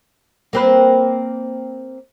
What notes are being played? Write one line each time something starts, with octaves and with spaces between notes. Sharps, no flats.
A#3 C4 B4